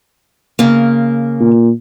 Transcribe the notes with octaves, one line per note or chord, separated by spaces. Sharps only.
C#3 A#3
A#2